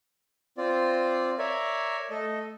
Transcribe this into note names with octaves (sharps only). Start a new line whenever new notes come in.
C4 F4 D5
A#4 C#5 D5 E5
A3 A4 D#5